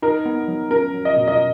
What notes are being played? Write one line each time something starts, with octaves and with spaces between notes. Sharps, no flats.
D#4 A#4
B3
F#3
C#4 A#4
F#3
D#5
B2
D#5